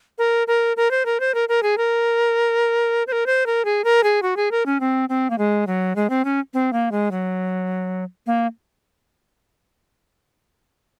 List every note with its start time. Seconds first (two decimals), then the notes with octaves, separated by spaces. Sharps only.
0.18 A#4
0.47 A#4
0.77 A#4
0.91 C5
1.06 A#4
1.20 C5
1.34 A#4
1.49 A#4
1.63 G#4
1.78 A#4
3.07 C5
3.12 A#4
3.26 C5
3.46 A#4
3.65 G#4
3.84 A#4
4.03 G#4
4.22 F#4
4.37 G#4
4.51 A#4
4.66 C#4
4.80 C4
5.09 C4
5.30 A#3
5.38 G#3
5.67 F#3
5.96 G#3
6.10 C4
6.25 C#4
6.54 C4
6.73 A#3
6.92 G#3
7.11 F#3
8.27 A#3